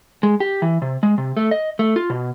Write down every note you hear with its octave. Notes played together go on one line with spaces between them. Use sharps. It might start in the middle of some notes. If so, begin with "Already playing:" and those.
G#3
G4
E3
C3
G#3
C3
A3
D#5
A3
F4
B2